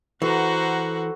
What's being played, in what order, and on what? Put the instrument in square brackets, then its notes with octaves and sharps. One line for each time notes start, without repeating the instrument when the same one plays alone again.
[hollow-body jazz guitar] E3 [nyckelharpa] F#4 F#5 [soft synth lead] A4 [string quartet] C5 A#5